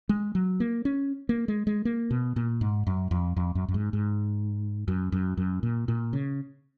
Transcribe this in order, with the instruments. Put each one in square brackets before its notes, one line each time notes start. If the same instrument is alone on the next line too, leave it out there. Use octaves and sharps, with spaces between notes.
[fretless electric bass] G#3
F#3
A#3
C#4
A#3
G#3
G#3
A#3
B2
A#2
G#2
F#2
F2
F2
F#2
F#2
G#2
G#2
F#2
F#2
F#2
A#2
A#2
C#3